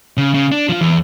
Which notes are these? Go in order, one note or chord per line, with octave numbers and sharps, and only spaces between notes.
C#3
C#3
D4
F3 F4
E2